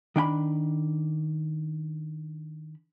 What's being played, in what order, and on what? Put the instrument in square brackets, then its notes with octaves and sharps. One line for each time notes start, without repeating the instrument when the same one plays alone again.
[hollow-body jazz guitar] D#3 D4 G5 B5